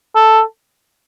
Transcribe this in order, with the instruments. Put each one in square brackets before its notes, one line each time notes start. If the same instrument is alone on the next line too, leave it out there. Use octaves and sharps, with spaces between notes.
[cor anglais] A4